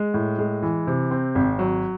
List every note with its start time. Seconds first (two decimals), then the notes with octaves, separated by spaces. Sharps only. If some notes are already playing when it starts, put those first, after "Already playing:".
Already playing: G#3
0.14 A2
0.38 G#3
0.63 E3
0.87 C3
1.11 C4
1.35 G#1
1.59 F#3